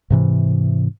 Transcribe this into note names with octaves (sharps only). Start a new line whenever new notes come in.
G#2 C3 E3